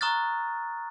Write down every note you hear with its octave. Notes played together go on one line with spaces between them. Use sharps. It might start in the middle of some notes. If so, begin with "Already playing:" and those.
A#5 C#6 D#6 F6 F#6 A6